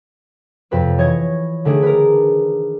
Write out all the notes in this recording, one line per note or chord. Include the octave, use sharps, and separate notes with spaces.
F2 C3 B4 C#5
E3 C#5 D#5 C#6 G#6
D3 D#3 A3 D4 G#4
A#4 B4